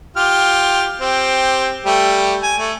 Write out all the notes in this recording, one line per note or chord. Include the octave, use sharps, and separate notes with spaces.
F4 G4 F6
C4 G4
G3 A3 G4
G#5
A3